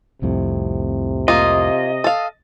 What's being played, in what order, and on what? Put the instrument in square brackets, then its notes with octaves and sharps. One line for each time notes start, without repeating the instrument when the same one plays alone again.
[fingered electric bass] C2 F2 A2 [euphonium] C3
[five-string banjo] A#3 F4 [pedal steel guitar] D#5
[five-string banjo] A4 F5